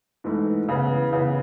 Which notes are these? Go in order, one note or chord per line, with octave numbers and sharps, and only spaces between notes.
G#2 E3 A3
C#3 E3 B3
C#3 E3 B3